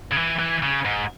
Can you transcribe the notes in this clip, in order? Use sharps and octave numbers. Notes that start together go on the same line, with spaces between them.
C#3
E3
E3
C#3
G#2